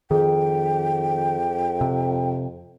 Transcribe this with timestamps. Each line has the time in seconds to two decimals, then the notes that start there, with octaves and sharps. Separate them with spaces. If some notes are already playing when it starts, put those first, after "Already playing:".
0.11 F2 D#3 G#4 G5
1.81 C3